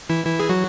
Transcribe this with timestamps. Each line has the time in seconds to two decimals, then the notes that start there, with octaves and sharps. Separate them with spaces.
0.10 E3 E4
0.25 E3 E4
0.39 G#4
0.49 F#3 F#4